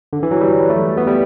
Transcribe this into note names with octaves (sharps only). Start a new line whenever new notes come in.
D3
E3
F#3
G3
A3
B3
G3